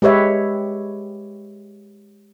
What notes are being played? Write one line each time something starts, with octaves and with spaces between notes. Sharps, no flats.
G#3 G4 B4 C#5 E5